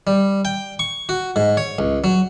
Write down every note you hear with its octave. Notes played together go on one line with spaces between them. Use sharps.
G3
G5
C#6
F#4
G#2
C#5
C#2
F#3